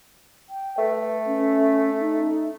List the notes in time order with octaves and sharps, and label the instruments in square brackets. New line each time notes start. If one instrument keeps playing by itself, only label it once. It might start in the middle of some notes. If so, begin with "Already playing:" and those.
[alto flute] G5
[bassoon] A3 [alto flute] B4
[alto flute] C#4
D#4